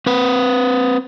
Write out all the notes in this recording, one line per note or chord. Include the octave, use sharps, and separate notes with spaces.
C4 B4